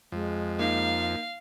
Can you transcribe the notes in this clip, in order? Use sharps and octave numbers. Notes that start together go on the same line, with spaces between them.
F2 G#3
A#3 D#4 F5